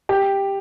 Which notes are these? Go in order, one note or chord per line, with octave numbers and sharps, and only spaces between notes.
G4